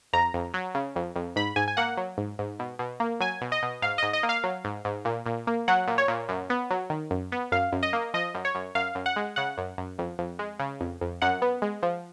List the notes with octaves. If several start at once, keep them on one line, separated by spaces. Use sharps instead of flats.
F2 A#5
F2
F#3
C#3
F2
F2
G#2 B5
G#2 G#5
G#5
A#3 F#5
F#3
G#2
G#2
B2
B2
A#3
F#3 G#5
B2
D#5
B2
G#2 F5
G#2 D#5
D#5
A#3
F5
F#3
G#2
G#2
A#2
A#2
A#3
F#3 F#5
A#2
C#5
A#2
F#2
B3
F#3
D#3
F#2
B3
F#2 F5
F#2
D#5
A#3
F3 D#5
F#2
C#5
F#2
F#2 F5
F#2
F#5
G#3
C#3 F#5
F#2
F#2
F2
F2
G#3
C#3
F2
F2
F#2 F#5
B3
G#3
F3